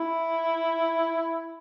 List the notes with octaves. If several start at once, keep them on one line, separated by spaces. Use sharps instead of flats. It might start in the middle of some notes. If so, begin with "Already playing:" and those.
Already playing: E4